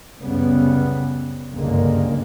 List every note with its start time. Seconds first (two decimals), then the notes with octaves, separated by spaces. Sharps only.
0.21 C2 F#2 C#3 G3 B3
1.51 F#1 C2 G2 D3 G#3 A#3